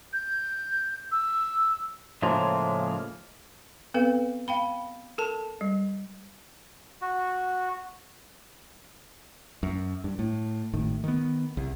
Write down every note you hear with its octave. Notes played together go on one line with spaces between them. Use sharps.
G6
E6
A2 C#3 F3 G#3 A#3
B3 C4 A4 B4 F5
F5 G5 B5
A4 A#4 A5
G3
F#4
F#2
G2
A2
G#1 A2 D#3
D#3 B3
C2